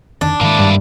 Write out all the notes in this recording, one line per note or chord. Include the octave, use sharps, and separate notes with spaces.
F2 D3 D#3 D4
G#2 D#3 G#3 A#3 E4
G2